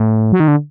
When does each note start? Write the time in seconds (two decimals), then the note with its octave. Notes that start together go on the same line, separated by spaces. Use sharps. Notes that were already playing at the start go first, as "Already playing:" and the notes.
Already playing: A2
0.32 F#3
0.40 D#3
0.48 D3